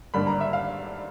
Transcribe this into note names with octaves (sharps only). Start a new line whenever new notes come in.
G#1 G2 D3 G3 A#3 B5
A#5
E5
F5